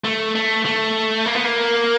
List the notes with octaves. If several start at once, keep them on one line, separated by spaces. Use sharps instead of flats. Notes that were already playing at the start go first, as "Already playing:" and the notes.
A3
A3
A3
A#3
B3
A#3